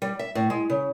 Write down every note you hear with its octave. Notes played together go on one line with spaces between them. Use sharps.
G3
E5
A2
G#3
C#3